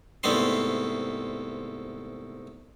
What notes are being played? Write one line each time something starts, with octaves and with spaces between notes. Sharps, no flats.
C2 G#2 A3 B3 C4 C6